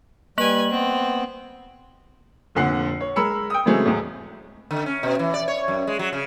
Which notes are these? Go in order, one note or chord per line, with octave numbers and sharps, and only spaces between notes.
G3 A#3 B4 G#5 F#7
B3 C4
F1 A#2 D3 F#5 C7
C#5
G#3 A#4 B5 E6 C#7
G5 D#6
C#3 E3 F#3 G#3 A3 C4
E2 A2
D3
C#4
B2
E3
D5
C#5
F#2
G#3
F#3
C#3